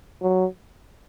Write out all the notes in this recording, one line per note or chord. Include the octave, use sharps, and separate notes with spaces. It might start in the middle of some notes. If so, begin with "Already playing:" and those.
F#3